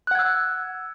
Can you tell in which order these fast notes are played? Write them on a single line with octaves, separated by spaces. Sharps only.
F#6 F#5 G#6 E6